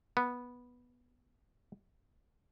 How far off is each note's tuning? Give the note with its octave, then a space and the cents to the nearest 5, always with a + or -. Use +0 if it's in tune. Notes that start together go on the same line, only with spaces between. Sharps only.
B3 -10